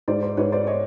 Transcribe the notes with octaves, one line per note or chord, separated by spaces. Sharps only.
G#2 C5 D5
C5
G#2 B4 C#5
C5 D5
C#5 D#5